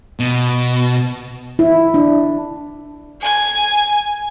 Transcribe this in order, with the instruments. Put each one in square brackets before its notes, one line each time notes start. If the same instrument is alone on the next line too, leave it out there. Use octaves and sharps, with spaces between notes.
[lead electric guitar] B2
[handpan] E4
D4
[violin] G#5 G#6